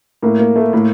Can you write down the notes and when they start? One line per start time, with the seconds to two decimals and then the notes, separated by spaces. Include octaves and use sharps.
0.23 A2 A#3
0.39 A#3
0.56 A3
0.73 A2 A#3